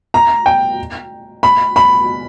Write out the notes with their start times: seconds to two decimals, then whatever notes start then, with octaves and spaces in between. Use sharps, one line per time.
0.14 A#5
0.46 G5
1.43 B5
1.76 B5